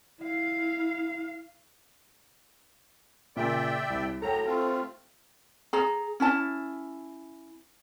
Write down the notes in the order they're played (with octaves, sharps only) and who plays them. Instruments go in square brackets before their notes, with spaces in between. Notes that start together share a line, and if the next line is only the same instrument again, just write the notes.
[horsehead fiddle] E4 F5
[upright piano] A#2 C#3 A#3 [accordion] D5 E5 G5
[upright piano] C2
[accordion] A2 F#3 A#5 [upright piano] A4 G5
[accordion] A3 C4 F4
[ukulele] G#4 A#5
C#4 E4 A5